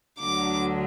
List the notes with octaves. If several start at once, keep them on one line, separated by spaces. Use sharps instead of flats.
D2 D3 F#3 D6